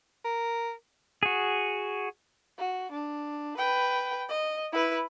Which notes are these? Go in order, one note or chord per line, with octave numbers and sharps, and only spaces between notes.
A#4
F#4 G#4
F#4
D4
B4 G5
D#5
E4 B4